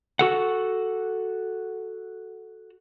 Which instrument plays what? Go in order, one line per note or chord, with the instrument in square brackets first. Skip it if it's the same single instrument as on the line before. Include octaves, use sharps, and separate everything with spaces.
[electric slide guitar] F#4 A4 F#5